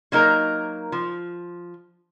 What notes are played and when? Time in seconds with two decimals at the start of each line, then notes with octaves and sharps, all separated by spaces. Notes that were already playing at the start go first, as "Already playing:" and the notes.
0.12 F#3 A#3 D#4 A#4
0.92 F3